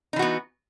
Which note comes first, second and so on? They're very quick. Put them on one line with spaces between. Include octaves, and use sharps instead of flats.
D#4 E3 F#4 B3